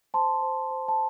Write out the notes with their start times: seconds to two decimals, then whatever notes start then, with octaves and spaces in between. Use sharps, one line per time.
0.14 C5 A5 C6
0.42 C5
0.71 C5
0.88 A5